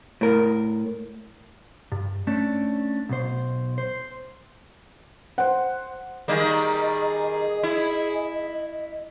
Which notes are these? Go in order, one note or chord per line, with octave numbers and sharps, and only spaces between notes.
A2 A#4
G2
A3 C#4 D4
B1 B2 C5
C5
C5 F#5
D#3 G3 A#3 G#4 D#5
E4